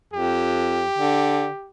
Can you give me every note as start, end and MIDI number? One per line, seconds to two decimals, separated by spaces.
0.13 0.85 41
0.13 1.70 67
0.98 1.48 50